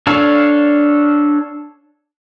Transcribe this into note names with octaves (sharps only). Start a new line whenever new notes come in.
D4 A4 C#5 F5